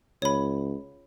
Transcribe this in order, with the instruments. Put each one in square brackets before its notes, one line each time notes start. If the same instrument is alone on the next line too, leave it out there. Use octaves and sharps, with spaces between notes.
[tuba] C#2 [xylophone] C#5 B5